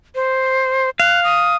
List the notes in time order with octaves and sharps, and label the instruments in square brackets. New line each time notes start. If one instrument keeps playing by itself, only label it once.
[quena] C5
[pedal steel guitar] F5 [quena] F#6
[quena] D#6